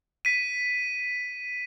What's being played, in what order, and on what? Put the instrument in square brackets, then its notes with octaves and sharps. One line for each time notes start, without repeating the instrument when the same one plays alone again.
[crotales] B6 D#7